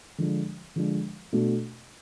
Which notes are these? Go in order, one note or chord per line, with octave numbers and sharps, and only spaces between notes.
D3 F3 G#3 D4
D3 F3 G#3 D4
B2 A3 D4 F#4